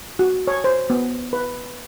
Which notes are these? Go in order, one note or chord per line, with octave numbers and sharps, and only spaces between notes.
F#4
C#5
C5
B3
B4